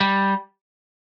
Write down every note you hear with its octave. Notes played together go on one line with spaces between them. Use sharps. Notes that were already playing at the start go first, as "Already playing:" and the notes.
G3